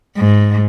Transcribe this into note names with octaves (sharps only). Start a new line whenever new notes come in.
G#2